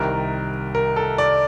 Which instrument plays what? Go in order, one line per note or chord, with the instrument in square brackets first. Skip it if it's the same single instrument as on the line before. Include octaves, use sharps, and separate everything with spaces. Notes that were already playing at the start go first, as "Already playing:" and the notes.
Already playing: [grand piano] C2 C3 D#3 A#4
A#4
A4
D5